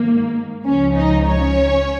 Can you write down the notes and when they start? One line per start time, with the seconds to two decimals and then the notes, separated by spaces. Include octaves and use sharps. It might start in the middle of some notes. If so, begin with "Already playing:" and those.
Already playing: G#2 D#3 A#3
0.65 C#2 C#3 F3 C#4
0.95 D#4 D#5
1.26 C#4 C#5